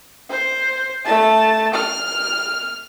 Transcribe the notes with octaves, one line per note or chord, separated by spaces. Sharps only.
C5
A3 A5
F6